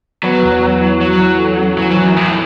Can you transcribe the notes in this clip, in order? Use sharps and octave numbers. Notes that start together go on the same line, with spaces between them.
F#3 B3
E2
B3
E4
F#3 C#5
E3
A4
C#4
E3 F#3
F#3
E3
F#2
A2 E3